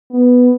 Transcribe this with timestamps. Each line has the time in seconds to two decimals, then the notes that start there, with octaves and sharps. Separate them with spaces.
0.11 B3